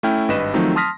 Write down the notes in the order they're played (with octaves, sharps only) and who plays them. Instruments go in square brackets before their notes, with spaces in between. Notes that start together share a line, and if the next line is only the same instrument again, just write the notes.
[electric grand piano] A3 C#4 E4 G5 F6
G#1 G2 B4 D#5 E7
D#3 F3 F#3 A3 C4 D#4
A5 C6 D#6 F6 A#6 B6